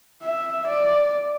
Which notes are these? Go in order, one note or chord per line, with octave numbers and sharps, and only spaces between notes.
E5
D5